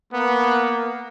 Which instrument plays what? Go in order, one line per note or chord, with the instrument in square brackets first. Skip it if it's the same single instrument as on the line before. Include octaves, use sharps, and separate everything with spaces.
[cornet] A#3 [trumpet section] B3